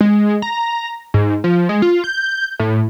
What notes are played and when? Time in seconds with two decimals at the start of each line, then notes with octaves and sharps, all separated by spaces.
0.01 G#3
0.42 A#5
1.14 G#2
1.44 F3
1.69 G#3
1.82 F4
2.04 G6
2.59 A2